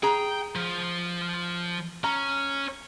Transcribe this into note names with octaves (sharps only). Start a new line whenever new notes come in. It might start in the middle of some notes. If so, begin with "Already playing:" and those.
G#4 G5 A#5
F3
C#4 A#5